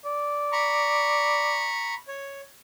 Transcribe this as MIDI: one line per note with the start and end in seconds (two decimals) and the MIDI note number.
0.05 1.68 74
0.52 1.94 82
0.52 1.94 83
0.52 1.94 85
2.08 2.41 73